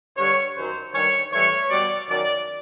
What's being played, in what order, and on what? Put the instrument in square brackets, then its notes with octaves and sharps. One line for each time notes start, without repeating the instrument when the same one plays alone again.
[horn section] G2 D3 G3 C#5
F#2 D#3 F#3 C5
G2 D#3 G3 C#5
A2 E3 G3 C#5
B2 G3 D5
F#2 D#3 F#3 D5